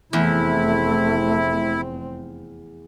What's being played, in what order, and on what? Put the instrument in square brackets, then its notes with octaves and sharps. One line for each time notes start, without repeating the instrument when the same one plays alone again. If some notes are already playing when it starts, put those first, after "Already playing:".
[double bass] F1 C4 [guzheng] E2 [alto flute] A3 [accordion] E4